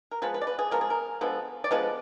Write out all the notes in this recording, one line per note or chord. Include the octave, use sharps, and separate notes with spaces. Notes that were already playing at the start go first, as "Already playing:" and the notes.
A#4
F3 G#3 B3 B4
B4
D5
B4
G#4
F3 G#3 B3 A#4
G#4
A#4
D3 F3 G#3 B3
D5
D3 F3 G#3 B3 B4